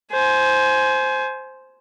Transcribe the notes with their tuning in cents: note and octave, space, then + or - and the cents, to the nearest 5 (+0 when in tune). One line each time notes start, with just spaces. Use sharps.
C5 +0 G#5 +25